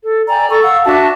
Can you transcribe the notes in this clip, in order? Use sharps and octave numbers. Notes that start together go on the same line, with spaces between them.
A4
D5 G5 G#5 A#5
A4 A#5 C#6
F5 F#5 E6
D4 F#4 E5 A5